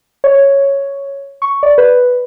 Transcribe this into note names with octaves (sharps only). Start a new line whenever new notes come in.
C#5
C#6
D5
B4